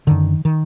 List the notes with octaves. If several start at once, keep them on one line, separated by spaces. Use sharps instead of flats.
F#2 D3 D#3
D#3